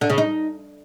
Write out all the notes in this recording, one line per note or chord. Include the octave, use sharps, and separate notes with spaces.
D3
C#3
D#4